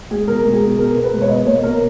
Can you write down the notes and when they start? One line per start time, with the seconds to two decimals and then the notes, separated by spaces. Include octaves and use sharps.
0.11 G#3 G#4
0.28 B2 A#4
0.45 G#3
0.53 G#4
0.61 B2
0.78 B3 A#4
0.96 B2
1.04 B4
1.13 G#3
1.22 C#5
1.29 B2 D#5
1.46 A#3 C#5
1.63 B2 A#4